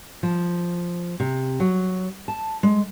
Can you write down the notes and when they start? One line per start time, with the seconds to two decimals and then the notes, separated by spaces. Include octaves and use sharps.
0.23 F3
1.20 C3
1.60 F#3
2.28 A5
2.63 G#3